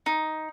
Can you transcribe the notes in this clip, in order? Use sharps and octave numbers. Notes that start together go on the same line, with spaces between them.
D#4